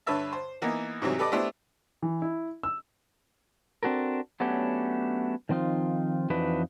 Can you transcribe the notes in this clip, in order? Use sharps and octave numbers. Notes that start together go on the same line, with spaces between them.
G2 D3 B4 C#5 E5 A5
C5
E3 A#3 B3 D#4
G#2 C3 E3 F#3 G3
G4 A4 B4 D5 D#5 D6
A3 B3 D4 E4 G4 C5
E3
E4
E6
C4 D4 F#4 A4 A#4
F#3 A3 B3 C#4 D4 G4
D#3 F3 C4 D#4 F4
F2 E3 D4 D#4 F#4 B4